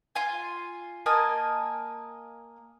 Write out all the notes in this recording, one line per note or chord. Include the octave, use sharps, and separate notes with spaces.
F4 G#5
A#3 D#5 G#5 A5